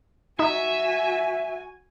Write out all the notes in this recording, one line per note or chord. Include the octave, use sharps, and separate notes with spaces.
D#4 F#4 E5 G#5